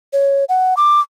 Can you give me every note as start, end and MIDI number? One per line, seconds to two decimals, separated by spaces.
0.13 0.44 73
0.49 0.74 78
0.77 1.00 86